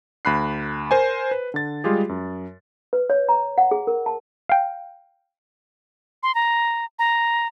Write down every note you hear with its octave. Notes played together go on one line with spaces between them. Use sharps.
D2 B5 F#6 C7
A#4 C5 G#5
B4
D3 A6
G3 G#3 F4 G4 G#4
F#2
B4
C#5
A#5
F#5
G#4
A#4
A5
F5 G5
C6
A#5
A#5